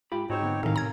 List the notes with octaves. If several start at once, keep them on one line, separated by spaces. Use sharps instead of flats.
G#2 F4 G4 B5
G#2 C4 D#4 F#4 C5 C#5
D3 A#3 B3
A2 C3 D#3 C#4 D#4 A#4 F5
A#5 G#6